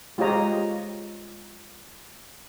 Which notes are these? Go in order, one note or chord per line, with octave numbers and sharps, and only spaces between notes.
G#3 F4 G4 C#5 D#5 A#5